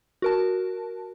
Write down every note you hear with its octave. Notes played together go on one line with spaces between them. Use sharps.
F#4 A#4 A5